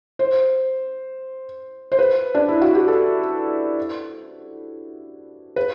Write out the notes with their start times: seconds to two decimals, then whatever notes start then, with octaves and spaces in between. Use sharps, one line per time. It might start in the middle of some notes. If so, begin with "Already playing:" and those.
0.19 C5
1.92 C5
1.99 B4
2.35 D4
2.48 E4
2.62 F#4
2.75 G4
2.88 A4
5.56 B4